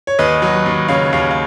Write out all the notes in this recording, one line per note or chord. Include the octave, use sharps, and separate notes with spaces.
C#5
D#2 B4 D#5
F#3
D#2
C#3 C#5 F5
D#2 C#5 F5
F5